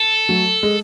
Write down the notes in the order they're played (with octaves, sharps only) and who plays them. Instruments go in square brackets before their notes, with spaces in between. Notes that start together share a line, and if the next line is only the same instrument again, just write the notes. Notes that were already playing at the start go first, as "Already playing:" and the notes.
Already playing: [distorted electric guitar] A4
[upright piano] F#3 A3
G#3